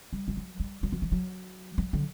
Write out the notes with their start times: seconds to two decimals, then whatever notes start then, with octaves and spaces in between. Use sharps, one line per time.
0.13 G3
0.28 G3
0.37 F#3
0.60 G3
0.83 G3
0.92 F#3
1.02 E3
1.12 F#3
1.78 F#3
1.93 D3